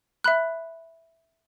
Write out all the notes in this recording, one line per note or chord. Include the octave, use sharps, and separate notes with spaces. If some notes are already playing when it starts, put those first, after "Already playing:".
E5 B5 F#6